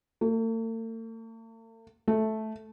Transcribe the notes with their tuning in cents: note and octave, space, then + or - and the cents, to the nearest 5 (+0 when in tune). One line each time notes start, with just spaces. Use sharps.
A3 +45
A3 -10